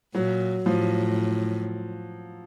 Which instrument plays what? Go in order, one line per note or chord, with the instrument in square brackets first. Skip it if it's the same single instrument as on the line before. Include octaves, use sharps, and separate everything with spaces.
[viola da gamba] A#2 [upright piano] F#3
[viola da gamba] A2 [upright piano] F3